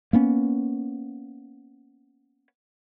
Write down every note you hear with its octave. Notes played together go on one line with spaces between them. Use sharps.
A#3 B3 C#4